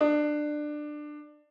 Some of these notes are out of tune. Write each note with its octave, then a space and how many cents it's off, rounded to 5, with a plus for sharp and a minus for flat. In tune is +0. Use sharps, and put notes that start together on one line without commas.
D4 +20